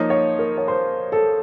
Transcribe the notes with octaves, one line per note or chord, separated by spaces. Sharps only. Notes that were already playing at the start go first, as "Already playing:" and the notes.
Already playing: F3 A#3 D#4 C#5
C#5
A#4
C#5
C5
A4